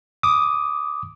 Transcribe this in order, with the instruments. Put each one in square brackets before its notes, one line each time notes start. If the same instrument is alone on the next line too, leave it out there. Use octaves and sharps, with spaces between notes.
[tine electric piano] D6 D#6